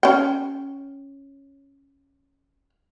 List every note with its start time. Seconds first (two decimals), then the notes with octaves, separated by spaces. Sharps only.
0.03 C#4 G5